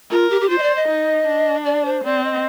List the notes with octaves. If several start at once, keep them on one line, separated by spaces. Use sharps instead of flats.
F4 A#4
G4
G4
F4 C5
D#5
D5
D#5
D#4
D4
D5
C5
C4 D5
D#5